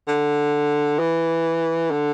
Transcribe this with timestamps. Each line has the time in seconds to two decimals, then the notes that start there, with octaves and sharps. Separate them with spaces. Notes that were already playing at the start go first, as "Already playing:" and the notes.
0.08 D3
0.99 E3
1.91 D3